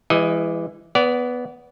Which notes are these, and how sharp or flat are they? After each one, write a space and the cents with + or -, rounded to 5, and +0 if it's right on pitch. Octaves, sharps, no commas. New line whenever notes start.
E3 +15 G#3 -30 D#5 +10
B3 +0 D5 -30